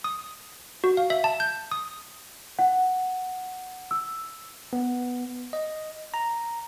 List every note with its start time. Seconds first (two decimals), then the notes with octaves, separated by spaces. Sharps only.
0.04 D#6
0.84 F#4
0.97 F5
1.10 E5
1.24 A5
1.40 G6
1.71 D#6
2.59 F#5
3.91 E6
4.73 B3
5.53 D#5
6.14 A#5